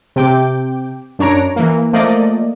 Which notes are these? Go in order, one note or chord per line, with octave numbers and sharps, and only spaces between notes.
C3 G5 D6
F#2 D4 C#5 A#5 D7
E3 A#3
F3 A3 A#3 D5 D#5